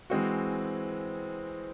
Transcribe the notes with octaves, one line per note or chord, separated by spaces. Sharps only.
E3 G#3 C4 F#4